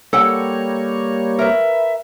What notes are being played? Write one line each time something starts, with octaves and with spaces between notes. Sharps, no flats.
G3 A#3 A4 C#5 F#5 G5
A#4 B4 E5